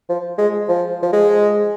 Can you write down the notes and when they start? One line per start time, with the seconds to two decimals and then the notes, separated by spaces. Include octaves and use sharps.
0.09 F3
0.38 G#3
0.68 F3
1.02 F3
1.13 G#3